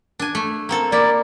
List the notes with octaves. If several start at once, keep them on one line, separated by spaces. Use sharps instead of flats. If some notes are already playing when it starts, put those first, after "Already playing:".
D4 G#5
A3
A#3 C4 A4
A#3 E4 D5